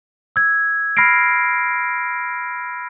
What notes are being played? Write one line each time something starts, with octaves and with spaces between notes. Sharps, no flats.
E6 G#6
B5 F6 A#6 C7 D7